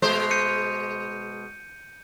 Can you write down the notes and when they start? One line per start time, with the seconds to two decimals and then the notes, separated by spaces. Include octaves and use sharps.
0.02 B2 G#3 C5
0.31 G6 C#7 D#7